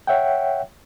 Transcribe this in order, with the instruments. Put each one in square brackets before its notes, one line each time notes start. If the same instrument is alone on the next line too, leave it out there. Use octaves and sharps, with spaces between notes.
[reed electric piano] C#5 E5 F#5 G5